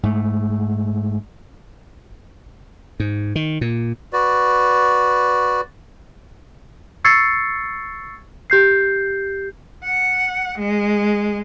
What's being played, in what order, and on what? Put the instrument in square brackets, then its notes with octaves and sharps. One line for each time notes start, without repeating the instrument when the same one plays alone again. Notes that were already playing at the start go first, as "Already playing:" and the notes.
[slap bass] G#2 A3
G#2
D#3
A#2
[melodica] F#4 B4 D5
[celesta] C#6 E6 G#6 A6 C7 C#7
G4 G6 C7
[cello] F#5
G#3